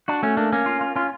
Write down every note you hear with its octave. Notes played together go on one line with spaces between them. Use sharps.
D4 F#4
A3 C#4
A#3 D4
A#3 C#4
F4
F4
C#4 F4